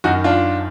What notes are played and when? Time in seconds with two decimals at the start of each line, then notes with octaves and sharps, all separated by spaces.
0.04 F#2 D#3 D#4 F#4
0.24 D4 F4